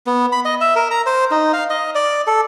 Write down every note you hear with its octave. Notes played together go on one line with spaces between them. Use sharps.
B3
B5
D#5
E5
A#4
A#5
C5
D#4
F5
D#5
D5
A4